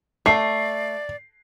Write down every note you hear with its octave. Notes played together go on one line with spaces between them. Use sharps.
A3 D5 C7